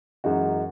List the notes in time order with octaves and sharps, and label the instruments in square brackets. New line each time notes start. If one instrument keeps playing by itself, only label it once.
[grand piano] F#2 E3 G#3 D#4 F#4